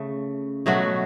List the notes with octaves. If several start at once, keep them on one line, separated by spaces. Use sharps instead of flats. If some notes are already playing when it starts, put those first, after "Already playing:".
Already playing: C#3 A3
B2 F#3 A3 F#4